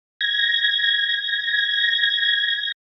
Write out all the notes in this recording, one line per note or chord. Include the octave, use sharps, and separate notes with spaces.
G#6 A#6